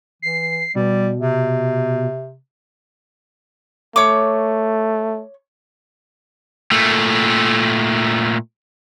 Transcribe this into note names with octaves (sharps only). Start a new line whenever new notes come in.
E3 C7
B2 G3
C3
A3 C#5 D6
A#2 A3